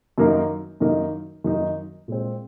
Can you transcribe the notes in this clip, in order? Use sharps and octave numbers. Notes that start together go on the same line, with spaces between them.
F#2 D#3 A#3 D#4 A#4
F#2 D#3 A#3 D#4 A#4
F#2 D#3 A#3 D#4 A#4
A#2 G#3 C4